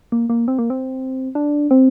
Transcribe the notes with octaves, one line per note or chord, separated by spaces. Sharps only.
A#3
A#3
C4
A#3
C4
D4
C4